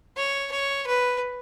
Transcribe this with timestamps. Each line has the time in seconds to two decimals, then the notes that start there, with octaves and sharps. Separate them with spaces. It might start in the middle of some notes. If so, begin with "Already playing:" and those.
0.17 C#5
0.52 C#5
0.87 B4